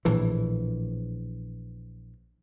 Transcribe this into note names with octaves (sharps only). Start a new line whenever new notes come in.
A#1 A2 E3